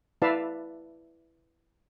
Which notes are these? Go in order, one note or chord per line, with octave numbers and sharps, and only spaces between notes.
E4 B4 D5 E5 F5 A5